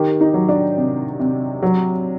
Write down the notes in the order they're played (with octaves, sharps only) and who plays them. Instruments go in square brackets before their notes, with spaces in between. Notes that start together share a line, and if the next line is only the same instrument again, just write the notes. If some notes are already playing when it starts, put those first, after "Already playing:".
Already playing: [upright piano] D#3 G4
D#4
F#3
D4
C3
C3
F#3